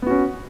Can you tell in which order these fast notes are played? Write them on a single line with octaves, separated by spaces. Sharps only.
B3 F#4 C#4